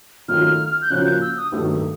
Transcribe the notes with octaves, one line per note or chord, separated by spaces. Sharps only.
D#3 F#3 A3 C#4 F4 F6
G6
C#3 F3 A#3 C#4 F#4 F#6
G6
E6
D#6
G2 D#3 F#3 A3 D4